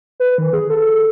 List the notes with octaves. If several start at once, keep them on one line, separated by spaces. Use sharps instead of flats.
B4
D#3
G#4
A4